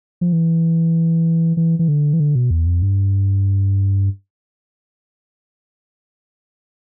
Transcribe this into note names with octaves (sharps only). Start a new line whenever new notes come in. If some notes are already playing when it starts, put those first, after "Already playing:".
F3
E3
E3
E3
D3
E3
D3
B2
E2
F2
G2